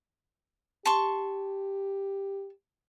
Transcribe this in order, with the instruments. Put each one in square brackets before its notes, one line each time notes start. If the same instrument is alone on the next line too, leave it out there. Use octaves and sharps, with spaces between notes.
[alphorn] G4 [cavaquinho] A5 C6 C#6